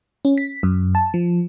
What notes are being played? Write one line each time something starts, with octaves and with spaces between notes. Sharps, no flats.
C#4
B6
F#2
A5
F3